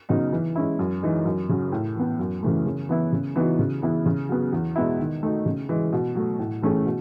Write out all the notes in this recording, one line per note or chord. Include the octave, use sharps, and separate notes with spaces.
C#3 F#3 B3 D#4
E3
G#3 C#4 E4
F#2
E3 G#3 D#4
F#2
C#3 F#3
A2
E3 B3
F#2
C#3 E3 A3
C#3
E3 B3 E4
C#3
E3 B3 D#4 F#4
C#3
E3 B3 E4
C#3
F#3 B3
E2
B2 G#3 B3 E4
D#3
A3 D#4 F#4
C#3
E3 G#3
B2
F#3 A3
A2
E3 A3 C#4 G#4
B2